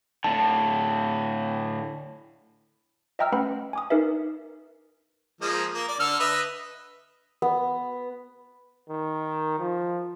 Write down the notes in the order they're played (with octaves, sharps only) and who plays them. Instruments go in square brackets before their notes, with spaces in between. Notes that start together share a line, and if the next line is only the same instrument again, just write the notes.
[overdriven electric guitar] A2 D3 [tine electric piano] A5
[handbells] D#5 E5 G5 A#5 E6 F6
A3 C#4 B4 F#5 G5 B5
G#5 D6 D#6
D#4 A#4 B4 E5
[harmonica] F3 G#3 A#3
A#3
D5
D3 A4 F6
B4 D#5 E5
[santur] B3
[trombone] D#3
F3